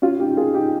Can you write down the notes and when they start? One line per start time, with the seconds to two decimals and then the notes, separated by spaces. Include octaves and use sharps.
0.02 C#4 F4
0.20 D#4 G4
0.37 F4 G#4
0.54 D#4 G4